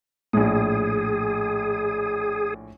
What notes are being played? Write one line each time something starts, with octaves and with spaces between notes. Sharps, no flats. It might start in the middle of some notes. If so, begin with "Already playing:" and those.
A#1 A2 G#4